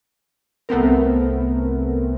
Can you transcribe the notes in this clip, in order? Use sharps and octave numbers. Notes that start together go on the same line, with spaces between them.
C2 A3 B3 C4 A#4